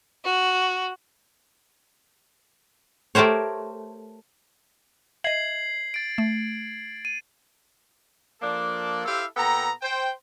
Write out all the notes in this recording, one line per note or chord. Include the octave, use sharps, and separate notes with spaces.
F#4
A3 G4 A#4 C5 C#5
D#5 E5 G#6 C7 F#7
A6 D7
A3
D#7
F3 A#3 D4 A4 D5
E4 G4 A4 C5 E5 F5
A#2 B3 A4 G5 A#5
C5 G5